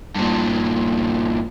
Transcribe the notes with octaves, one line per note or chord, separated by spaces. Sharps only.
G2 A#2